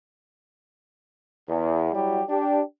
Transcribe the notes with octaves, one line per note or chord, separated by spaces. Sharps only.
E2
F#3 G3 E4 F#4 G4
D4 G4